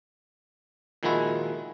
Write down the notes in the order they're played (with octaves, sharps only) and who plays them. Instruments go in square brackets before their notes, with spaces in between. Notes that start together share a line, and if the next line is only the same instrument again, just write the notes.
[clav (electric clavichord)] A#2 D#3 F3 G#3 E4 F#4